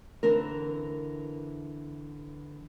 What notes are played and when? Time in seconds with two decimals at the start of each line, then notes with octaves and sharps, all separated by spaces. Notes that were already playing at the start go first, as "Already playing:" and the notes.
0.23 D3 E3 C4 A#4